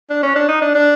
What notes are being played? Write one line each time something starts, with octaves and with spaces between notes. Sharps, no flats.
D4
C#4
D4
D#4
D4
D4